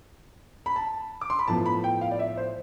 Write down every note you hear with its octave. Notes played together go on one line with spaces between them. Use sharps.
B5
A5
D6
C6
B5
A2 F3 B3 A5
B5
G5
F5
D5
E5
C5